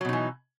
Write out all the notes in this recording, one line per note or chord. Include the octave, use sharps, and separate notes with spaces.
B2 E3 F#3 D#4